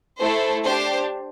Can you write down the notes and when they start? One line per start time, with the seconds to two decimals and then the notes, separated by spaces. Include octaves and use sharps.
0.19 A3 E4 A4 C5
0.64 D4 G4 C5